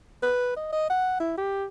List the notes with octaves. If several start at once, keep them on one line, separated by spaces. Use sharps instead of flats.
B4
D#5
D#5
F#5
E4
G4